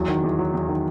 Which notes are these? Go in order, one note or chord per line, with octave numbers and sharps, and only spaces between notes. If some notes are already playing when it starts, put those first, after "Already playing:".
Already playing: E2 F#3
D#3
E2
F#3
E2
D#3